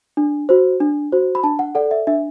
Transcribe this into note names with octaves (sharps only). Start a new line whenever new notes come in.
D4
F#4 C5
D4
F#4 C5
B5
D4 A5
F#5
A4 D5 F#5
E5
D4 E5